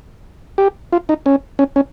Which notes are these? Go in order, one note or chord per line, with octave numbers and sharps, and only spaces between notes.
G4
F4
D#4
C#4
C#4
C#4